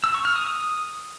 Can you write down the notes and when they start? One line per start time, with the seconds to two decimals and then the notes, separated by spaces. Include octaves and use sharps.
0.04 E6
0.14 C#6
0.25 F6
0.36 D#6
0.46 D#6